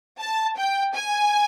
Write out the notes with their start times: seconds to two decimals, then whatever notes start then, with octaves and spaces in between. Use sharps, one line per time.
0.20 A5
0.57 G5
0.95 G#5